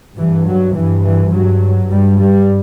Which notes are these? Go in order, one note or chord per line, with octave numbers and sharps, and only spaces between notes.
G2 E3
F#3
G2 E3
E3
G2 F#3
G2 G3
G3